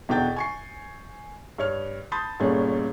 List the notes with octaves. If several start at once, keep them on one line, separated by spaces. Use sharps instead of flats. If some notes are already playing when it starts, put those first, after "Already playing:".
E2 B2 D3 G5 G6 A6
G#5 C#6 C7
G2 C#5 F6
A5 B5 C6 D#6 G6 A6
G1 G2 A#2 A3 C#4 G#4